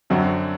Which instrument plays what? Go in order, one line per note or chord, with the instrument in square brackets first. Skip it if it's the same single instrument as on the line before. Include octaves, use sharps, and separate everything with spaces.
[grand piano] F#2 [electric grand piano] D3 F#3 C4 F#4